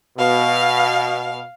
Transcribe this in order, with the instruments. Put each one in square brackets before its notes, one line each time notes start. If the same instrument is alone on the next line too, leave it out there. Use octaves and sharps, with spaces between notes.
[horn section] B2 [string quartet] F5